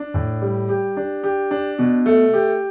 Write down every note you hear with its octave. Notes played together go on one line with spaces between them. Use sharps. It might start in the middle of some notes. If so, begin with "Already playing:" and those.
Already playing: D4
A2
G3
G4
D4
G4
D4
B2
A3
G4